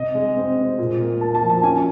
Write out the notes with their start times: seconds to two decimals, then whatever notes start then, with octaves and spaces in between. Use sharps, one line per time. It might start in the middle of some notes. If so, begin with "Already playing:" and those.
Already playing: C3 D#5
0.15 G#3
0.37 C4
0.57 C4
0.78 A#2
1.00 A#3
1.21 A#3 A5
1.35 A5
1.42 F3
1.50 A5
1.63 C#4 G#5